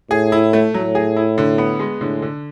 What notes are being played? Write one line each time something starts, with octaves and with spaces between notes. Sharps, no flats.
A2 G#4
E4
A3
A2 F#3
G#4
E4
D3
B3
G#3
A2 D3
D3